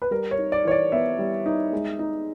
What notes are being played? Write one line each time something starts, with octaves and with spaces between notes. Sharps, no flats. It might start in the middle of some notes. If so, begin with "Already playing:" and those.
B4
G3 A#4
C#5
D#4
D5
E3 C#5
D5
B3 E5
G3
D#4
G#3
D#4